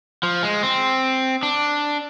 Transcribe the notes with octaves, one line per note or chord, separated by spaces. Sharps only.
F3
G#3
C4
D4